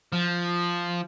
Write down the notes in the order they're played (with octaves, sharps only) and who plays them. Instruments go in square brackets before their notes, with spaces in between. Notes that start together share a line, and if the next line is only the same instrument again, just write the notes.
[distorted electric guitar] F3